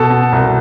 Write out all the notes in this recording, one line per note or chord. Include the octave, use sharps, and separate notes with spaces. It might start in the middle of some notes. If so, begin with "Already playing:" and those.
Already playing: B2 A4
B2
C2